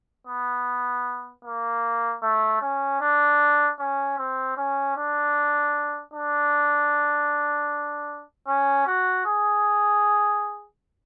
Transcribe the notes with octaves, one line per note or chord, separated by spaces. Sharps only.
B3
A#3
A3
C#4
D4
C#4
C4
C#4
D4
D4
C#4
F#4
G#4